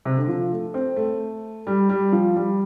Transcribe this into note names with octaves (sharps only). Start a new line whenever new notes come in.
C3
D3
F3
A3
C4
A3
G3
G3
F3
G3